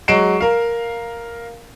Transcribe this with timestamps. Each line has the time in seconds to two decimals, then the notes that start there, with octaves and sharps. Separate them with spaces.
0.08 F#3 G#3 C7 D7 E7
0.41 A#4 F5